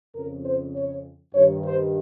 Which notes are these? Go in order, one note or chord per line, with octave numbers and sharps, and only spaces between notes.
F2 C#3 A#4
C5
C#5
G2 D#3 C#5
C5